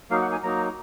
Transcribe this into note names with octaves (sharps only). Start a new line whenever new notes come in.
F#3 A#3 D#4 F5
F#5
G#5
F#3 A#3 D#4 A#5